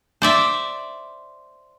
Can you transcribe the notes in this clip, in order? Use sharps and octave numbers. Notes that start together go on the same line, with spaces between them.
C5 D5 E5